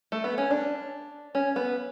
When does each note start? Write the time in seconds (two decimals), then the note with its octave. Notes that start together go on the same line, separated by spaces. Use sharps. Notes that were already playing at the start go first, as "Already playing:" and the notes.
0.12 A3
0.24 B3
0.38 C#4
0.51 D4
1.35 C#4
1.56 B3